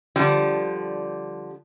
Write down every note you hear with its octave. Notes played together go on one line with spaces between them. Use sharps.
D3 F3 G3